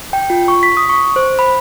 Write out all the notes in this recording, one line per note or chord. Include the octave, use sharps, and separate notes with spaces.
G5
F4
C#6
B6
D#6
C#6
C5
B5